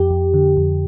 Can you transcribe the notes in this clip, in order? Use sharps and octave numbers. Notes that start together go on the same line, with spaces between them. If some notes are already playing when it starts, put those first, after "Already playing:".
Already playing: F2 G4
F2
D3
F2